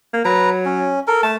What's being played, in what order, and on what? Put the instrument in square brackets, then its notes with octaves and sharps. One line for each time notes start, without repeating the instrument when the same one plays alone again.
[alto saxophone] A#3
[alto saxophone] F#3 [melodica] B4 A#5
[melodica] C#4
A4 A#4
[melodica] A3 [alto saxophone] A5